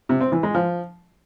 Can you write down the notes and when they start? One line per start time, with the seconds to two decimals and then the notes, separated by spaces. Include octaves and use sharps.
0.09 C3
0.21 C4
0.32 E3
0.43 G#3
0.55 F3